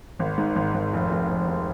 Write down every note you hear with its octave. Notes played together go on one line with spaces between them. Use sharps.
G#1
G#2
G#1
G#1
F1
F1
F1
F1